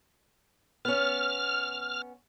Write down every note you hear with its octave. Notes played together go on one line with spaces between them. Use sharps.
B3 C#4 F6